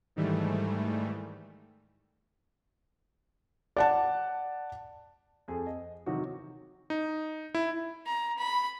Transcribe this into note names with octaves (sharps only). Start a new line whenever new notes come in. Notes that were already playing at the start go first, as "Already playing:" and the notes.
G#2 D#3 E3 G3 A3
D5 F#5 A5
F2 G#4 A4
D#5
C3 D#3 E3 F#3 D#4 F#4
D#4
E4
A#5
B5